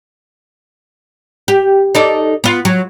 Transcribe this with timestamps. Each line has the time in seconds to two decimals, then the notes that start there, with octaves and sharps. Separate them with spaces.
1.48 G4
1.95 D#4 A4 D5
2.44 B3 F4
2.65 F#3